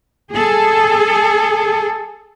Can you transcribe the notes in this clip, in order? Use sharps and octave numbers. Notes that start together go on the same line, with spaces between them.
G#4 A4